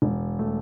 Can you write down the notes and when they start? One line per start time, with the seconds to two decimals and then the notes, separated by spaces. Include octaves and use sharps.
0.02 E1
0.39 A3